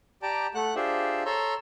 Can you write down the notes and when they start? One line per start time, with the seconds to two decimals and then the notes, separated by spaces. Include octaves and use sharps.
0.22 G4 D5 G5 A5 A#5
0.55 A3 F#5 F#6
0.76 D4 F4 G4 G#4 C5 E5
1.25 A4 C#5 A#5 C6 E6